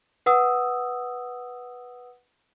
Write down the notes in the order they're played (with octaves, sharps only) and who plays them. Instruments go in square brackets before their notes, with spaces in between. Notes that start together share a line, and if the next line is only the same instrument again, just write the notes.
[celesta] B4 F#5 D#6 E6